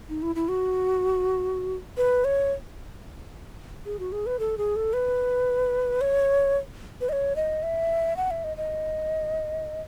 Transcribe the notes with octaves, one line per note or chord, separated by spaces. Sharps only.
D#4
E4
E4
F#4
B4
C#5
G#4
F#4
G#4
B4
A4
G#4
A4
B4
C#5
B4
D#5
C#5
D#5
E5
F#5
E5
D#5
D#5